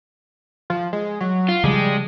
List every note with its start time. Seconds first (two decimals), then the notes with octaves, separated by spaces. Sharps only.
0.70 F3
0.93 G#3
1.20 F#3
1.49 F4
1.64 C#3 F3 G3 G#3